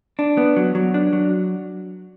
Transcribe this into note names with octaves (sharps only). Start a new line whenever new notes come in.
D4
B3
F#3
F#3
D4
F#3